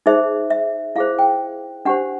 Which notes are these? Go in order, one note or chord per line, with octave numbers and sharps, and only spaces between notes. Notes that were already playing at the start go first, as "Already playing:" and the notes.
D#4 G#4 C5 E5
E5
E4 G#4 C5 F5
G5
D4 G4 C5 F#5